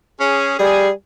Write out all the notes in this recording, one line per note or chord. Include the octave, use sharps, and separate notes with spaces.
C#4 G#4
G3 G#4